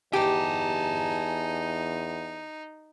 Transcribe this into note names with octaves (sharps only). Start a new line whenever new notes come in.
E2 D#4 G4 G#5 A5